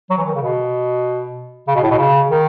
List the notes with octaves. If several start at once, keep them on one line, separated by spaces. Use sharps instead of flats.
F#3
E3
D#3
C#3
B2
C#3
B2
A2
B2
C#3
D#3